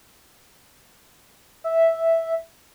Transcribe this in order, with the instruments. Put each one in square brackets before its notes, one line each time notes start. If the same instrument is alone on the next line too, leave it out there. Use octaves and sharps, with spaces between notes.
[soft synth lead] E5